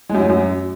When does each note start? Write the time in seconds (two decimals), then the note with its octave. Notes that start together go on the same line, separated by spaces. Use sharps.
0.10 G#3
0.15 F#2
0.20 F#3
0.25 A2
0.30 F#2